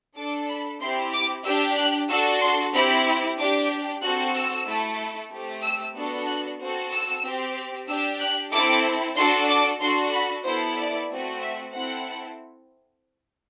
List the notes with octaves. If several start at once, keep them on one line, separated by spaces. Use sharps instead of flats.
D4 A4 D6
B5
C4 E4 G4 C6
D6
D4 G4 E6
F#6
D4 F#4 A4 E6
C6
C4 E4 G4 B5
D4 G4 D6
C4 F#4 A4 F#6
E6
A3 E4 A4
A3 C4 G4
E6
B3 D4 F#4 A4
F#6
C4 F#4 A4
E6
C4 G4
D4 G4 E6
F#6
C4 E4 A4 D6
D4 F#4 A4 C6
D6
D4 F#4 A4 C6
B5
B3 E4 A4 C5
D5
A3 C4 F#4
E5
C4 E4 A4 F#5